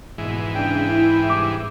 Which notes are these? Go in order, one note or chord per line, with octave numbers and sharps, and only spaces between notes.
A#1 G#2 B2 E3
C#2 C#3 D4 G5
E4
G2 C3 D6